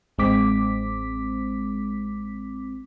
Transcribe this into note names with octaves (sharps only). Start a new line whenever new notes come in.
A1 G#3 C4 D6 B6